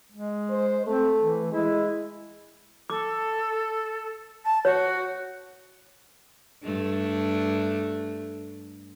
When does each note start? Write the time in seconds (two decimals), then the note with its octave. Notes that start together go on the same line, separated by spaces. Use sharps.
0.12 G#3
0.50 C5
0.87 A3 C4
1.22 E3
1.52 G#3 E4
2.90 A4 D6
4.45 A5
4.65 F#4 C#5
6.63 G2 A3 D4